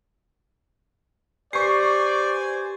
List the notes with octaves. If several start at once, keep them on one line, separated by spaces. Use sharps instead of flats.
G4 B4 C5 D5 G#5 C#6 C7